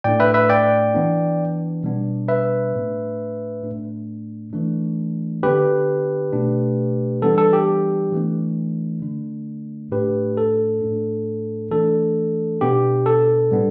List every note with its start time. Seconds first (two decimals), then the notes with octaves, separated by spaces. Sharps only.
0.04 A2 A3 D4 D5 G5
0.20 B4 E5
0.34 B4 E5
0.49 D5 G5
0.94 E3 B3 D4
1.84 B2 G3 B3 D4
2.28 B4 E5
2.74 A2 A3 D4
3.63 A2 A3 D4
4.53 E3 A3 D4
5.43 D3 B3 D4 G4 B4
6.33 B2 A3 D4
7.22 E3 G3 B3 D4 A4
7.38 A4
7.53 G4
8.12 E3 A3 D4
9.02 D3 A3 D4
9.92 A2 A3 D4 G4 B4
10.37 A4
10.81 A2 A3 D4
11.71 E3 A3 D4 A4
12.61 B2 B3 D4 G4
13.06 A4
13.51 A2 G3 B3 D4